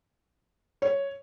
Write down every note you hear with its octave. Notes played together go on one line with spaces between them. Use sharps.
C#5